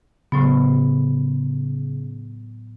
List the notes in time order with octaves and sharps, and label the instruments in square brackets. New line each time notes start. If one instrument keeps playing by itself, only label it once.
[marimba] A2 F#3 B3 [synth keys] C#3